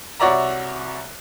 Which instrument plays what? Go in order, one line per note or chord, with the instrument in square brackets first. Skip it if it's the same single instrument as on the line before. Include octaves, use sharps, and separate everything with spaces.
[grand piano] C2 F#4 C#5 D5 E5 A#5